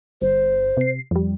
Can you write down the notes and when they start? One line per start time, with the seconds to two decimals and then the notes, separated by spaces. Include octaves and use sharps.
0.22 G1 C5
0.77 C3 C7
1.11 F2 G3